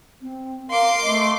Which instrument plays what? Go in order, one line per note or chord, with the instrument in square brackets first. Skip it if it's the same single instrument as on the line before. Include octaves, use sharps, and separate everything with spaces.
[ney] C4
[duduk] A#4 [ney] F5 [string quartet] C6 D6
[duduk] A3 [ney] D#5